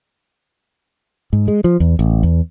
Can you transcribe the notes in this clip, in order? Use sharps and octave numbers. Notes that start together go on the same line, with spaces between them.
G#2
G#3
F3
E2
A1
E2